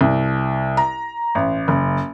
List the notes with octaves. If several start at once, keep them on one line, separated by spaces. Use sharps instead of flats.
C2
A#5
A1
F#1